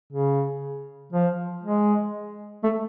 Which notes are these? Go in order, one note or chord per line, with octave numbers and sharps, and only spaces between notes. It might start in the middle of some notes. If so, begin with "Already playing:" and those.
C#3
F3
G#3
A3